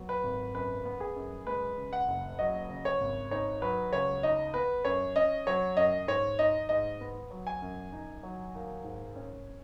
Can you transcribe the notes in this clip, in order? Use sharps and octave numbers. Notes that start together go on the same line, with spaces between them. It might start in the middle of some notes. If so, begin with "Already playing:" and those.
Already playing: F#3 B3
B4
G#1
F#2 B4
B3
G#4
F#2
G#3 B4
C#3
F#5
F#1
F#3 D#5
C#3
C#5
G#1
D#4 C#5
F#3 B4
C#2 C#5
D#4 D#5
B3 B4
F#2 C#5
C#4 D#5
F#3 C#5
F#2 D#5
G#2 C#5
D#4 D#5
G#2 D#5
B3
F#3
G#5
F#2
D#4
F#3
D#2
G#2
C#4